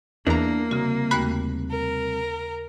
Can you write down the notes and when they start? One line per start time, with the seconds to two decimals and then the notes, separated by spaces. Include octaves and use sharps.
0.27 E2 A#3 D4 A#4 D5 A#5
0.71 C2 C#3 F#4
1.11 D#2 A3 F#4 B5 F#6
1.71 A#4